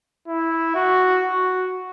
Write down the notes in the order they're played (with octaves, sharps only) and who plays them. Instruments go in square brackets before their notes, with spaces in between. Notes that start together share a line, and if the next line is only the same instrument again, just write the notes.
[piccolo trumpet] E4
F#4
F#4